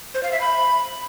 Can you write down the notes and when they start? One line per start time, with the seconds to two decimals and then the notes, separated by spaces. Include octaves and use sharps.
0.15 C5
0.23 F5
0.32 E5
0.41 B5